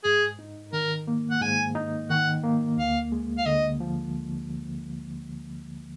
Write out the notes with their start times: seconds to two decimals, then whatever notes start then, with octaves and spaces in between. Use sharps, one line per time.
0.04 G#2 G#4
0.39 D#4
0.73 D#3 A#4
1.07 A#3
1.31 F#5
1.42 G#2 G#5
1.75 D#4
2.10 D#3 F#5
2.44 A#3
2.77 D2 F5
3.12 G#3
3.38 F5
3.46 D3 D#5
3.80 F3